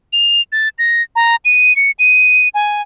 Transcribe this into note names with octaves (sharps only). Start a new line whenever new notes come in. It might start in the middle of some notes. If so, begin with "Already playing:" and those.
F7
A6
A#6
A#5
D#7
C#7
D#7
G#5